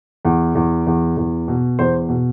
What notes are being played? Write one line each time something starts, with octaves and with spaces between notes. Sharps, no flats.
E2
E2
E2
E2
B2
E2 C5
B2